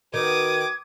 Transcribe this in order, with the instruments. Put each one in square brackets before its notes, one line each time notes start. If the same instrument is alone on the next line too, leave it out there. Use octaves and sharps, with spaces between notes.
[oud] D#3 [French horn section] F#4 B4 [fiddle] D6 D#6 [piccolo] G#6